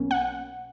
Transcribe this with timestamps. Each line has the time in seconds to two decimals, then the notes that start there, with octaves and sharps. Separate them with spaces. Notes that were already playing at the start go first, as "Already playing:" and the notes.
Already playing: B1 B2 A#3 C#4
0.11 F#5